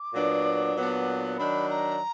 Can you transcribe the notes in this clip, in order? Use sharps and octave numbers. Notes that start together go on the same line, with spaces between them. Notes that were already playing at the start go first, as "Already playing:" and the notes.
Already playing: D6
A#2 F#3 B3 D4
A#2 F#3 B3 D4
D#3 F#3 D4 B5
A#5